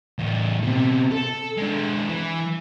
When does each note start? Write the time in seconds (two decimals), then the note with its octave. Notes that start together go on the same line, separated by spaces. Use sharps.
0.19 E2 A2
0.63 B2 C4
1.11 A4
1.57 G#3 D4
2.08 E3